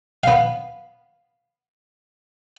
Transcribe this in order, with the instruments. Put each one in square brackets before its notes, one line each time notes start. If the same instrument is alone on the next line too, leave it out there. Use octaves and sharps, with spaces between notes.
[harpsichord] B3 F5